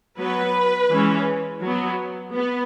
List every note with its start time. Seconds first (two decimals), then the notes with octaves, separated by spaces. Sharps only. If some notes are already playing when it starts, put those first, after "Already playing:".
0.19 F#3 B3 B4
0.91 E3 G#3 C#4
1.63 F#3 B3
2.35 B3